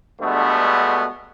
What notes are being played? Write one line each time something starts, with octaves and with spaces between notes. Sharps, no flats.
G2 B2 D3 G#3 A3 B3